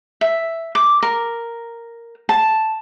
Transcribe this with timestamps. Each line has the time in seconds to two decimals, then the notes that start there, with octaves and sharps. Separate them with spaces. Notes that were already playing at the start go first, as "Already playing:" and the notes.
0.21 E5
0.75 D6
1.03 A#4
2.29 A5